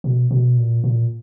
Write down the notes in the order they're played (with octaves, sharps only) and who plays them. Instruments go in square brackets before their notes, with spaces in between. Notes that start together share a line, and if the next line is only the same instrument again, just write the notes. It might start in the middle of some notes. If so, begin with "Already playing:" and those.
[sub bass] B2
B2
A#2
A#2